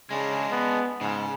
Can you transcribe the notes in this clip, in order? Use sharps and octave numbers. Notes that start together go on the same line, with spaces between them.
C#3 G#3 D4
B3
G#2 C#3